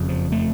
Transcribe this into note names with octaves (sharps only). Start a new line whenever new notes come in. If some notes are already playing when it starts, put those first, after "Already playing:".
Already playing: F#1 F2 C#3
F3
A3